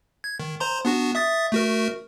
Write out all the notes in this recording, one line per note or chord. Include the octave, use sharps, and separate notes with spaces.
G#6
D#3
C5 A#5 C6
B3 D4 F#4
E5 D#6 A6
A3 F#4 A#4